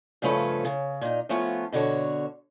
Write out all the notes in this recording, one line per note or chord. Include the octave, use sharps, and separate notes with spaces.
G2 C#3 F3 A3 C#4 B4
C#3
A#2 D#4
F3 A3 B3 C#4 F4
B2 D3 F#4 C#5